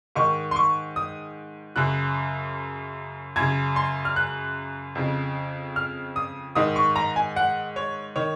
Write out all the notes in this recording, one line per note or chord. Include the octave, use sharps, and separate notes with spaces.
G#2 D#3 C#6
C6
C#6
D#6
F#2 C#3 F#6
F#2 C#3 G#6
C6
F6
F#6
F2 C#3
F6
D#6
G#2 D#3 D#6
C#6
A#5
G#5
F#5
C#5
D#3 C#5